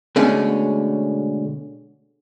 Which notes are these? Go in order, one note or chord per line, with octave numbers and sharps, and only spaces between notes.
B2 D3 G#3 A3 C#4